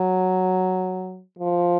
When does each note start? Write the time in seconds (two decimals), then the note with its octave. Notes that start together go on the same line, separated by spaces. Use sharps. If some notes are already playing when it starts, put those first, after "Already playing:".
Already playing: F#3
1.39 F3